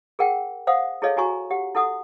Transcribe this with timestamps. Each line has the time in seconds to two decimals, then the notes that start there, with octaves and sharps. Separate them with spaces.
0.19 G#4 A#4 F#5 G5
0.67 C5 F5 F#5 D#6
1.02 E4 G#4 A4 C#5 D#5 F5
1.17 E4 F#4 G#5 A#5 C#6
1.51 G4 F#5
1.75 E4 A4 F#5 D#6